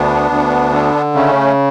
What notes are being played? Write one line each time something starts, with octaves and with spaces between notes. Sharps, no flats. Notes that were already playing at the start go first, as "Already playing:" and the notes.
Already playing: D2 B3 D4
D2
D3
C#3 A3 C#4